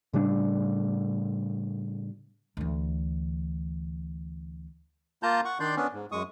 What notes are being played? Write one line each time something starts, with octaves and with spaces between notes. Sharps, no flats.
A2 C#3 G3 D4
D2 E3
A#3 F4 A5 A#5 G6
F#5 C#6
D#3 D4 D5 C6 G6
B3 C#4 D4
G#2
F#2 G#3 C#6 D#6